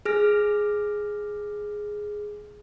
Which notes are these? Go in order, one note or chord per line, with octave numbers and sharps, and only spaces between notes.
G#4 F6 A#6